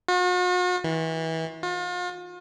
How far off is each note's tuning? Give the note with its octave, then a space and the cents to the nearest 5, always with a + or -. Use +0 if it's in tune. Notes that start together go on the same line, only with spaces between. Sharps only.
F#4 -45
E3 -30
F4 +40